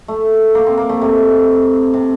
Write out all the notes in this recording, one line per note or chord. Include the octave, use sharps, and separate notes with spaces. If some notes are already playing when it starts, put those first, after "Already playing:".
A3
A#3
C4
A#3
A3
C3
C3